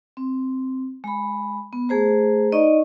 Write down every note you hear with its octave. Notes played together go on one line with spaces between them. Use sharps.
C4
G#3 B5
B3
A3 G#4 C5 A#5
D#4 D5 D#5 C#6